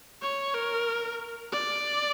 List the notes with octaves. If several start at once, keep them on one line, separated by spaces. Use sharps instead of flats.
C#5
A#4
D5